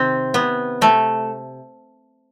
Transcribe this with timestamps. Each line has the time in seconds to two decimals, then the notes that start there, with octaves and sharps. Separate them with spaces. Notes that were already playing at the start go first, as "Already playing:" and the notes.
Already playing: C3 D#3 C4
0.34 C3 B3
0.81 C3 A3